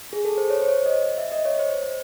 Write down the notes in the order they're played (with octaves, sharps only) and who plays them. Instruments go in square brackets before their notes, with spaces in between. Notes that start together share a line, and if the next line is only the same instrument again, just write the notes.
[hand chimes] G#4
A4
C5
C#5
C5
C#5
D#5
E5
D#5
C#5
C5